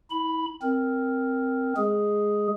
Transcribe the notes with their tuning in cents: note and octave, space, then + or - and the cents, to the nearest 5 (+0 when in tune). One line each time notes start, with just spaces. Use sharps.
E4 -40 B5 +0
C4 +0 A#4 +0
G#3 +0 G#4 +0